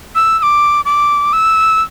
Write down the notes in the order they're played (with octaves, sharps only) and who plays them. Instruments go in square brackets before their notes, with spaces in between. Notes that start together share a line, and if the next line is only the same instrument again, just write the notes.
[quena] E6
E6
D6
D6
E6